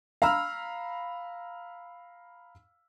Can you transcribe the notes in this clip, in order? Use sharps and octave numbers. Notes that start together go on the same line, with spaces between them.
F5 A#5 B5 E6 F6